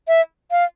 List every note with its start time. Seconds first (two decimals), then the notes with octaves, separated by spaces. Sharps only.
0.08 E5
0.51 F5